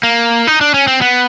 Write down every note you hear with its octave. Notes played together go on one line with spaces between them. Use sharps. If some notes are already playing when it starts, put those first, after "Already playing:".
A#3
D#4
D4
C#4
C4
B3